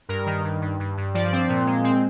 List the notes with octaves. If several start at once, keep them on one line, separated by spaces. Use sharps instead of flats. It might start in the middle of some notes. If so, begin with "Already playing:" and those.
G2 A#4
D#3
G2
G2
G2
G2
F3 D5
C4
A#2
G#3
C4